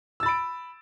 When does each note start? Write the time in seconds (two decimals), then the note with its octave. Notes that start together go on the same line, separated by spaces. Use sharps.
0.20 E6
0.23 A6
0.26 B5
0.28 D7